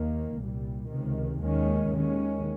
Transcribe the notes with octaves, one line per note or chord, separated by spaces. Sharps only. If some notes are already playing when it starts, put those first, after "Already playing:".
Already playing: D#2 D#3 A#3
C2 A#2 G3
C#2 C3 D#3
D#2 D#3 G#3 C#4
D#2 D#3 G#3 C#4